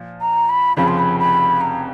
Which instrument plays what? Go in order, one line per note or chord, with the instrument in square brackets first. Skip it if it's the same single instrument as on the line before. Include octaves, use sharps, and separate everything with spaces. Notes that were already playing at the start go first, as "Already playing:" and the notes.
Already playing: [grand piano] A#2 F3
[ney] A#5
B5
[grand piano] F1 F2 C#3 F3 [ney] B5
[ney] C6
B5
B5
A#5